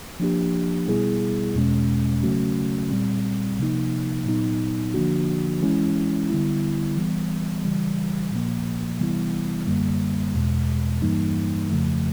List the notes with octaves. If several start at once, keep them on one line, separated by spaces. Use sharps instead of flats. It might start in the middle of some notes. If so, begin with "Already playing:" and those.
F3 A#3 D4 G4
B2 G3 B3 E4 G#4
E2 B2 G#3 C#4
C#3 F#3 A3 C#4 F#4
A#2 G3 C4
C3 F3 A#3 D#4
A#2 F#3 B3 D#4
D3 F3 A#3 D4 F#4
E3 G#3 C#4 E4
D3 G3 B3 E4
E3 G3 B3
C#3 E3 G3
A#2 F3 A#3
C3 E3 G3 B3 E4
F#2 D3 G3 A#3
E2 B2 G#3
G2 E3 G3 A#3 D#4
F2 C#3 F3 A3